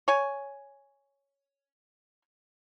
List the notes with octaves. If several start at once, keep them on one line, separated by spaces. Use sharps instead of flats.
C#5 G#5